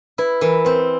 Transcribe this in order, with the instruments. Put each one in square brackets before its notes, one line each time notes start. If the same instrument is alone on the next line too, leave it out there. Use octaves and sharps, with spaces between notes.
[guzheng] E4 [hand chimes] B4
[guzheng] E3 [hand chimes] A#4
[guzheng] C4 [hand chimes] B4